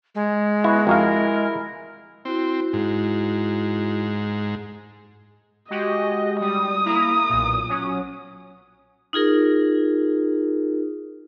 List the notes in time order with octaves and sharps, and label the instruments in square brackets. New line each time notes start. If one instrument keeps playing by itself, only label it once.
[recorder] G#3
[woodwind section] B3 F#4 [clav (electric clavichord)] E4
[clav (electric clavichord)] F2 F#4 F5 [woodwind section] E4 A#4
[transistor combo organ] C4 [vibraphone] E4 F#4
[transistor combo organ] G#2
[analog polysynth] G#3 F#4 G4 [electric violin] D#5
[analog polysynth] G3 [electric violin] D#6
[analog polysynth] A#3 E4 A#5
B1 A#2
F#3 C#4
[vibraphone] D#4 F4 G#4 A#4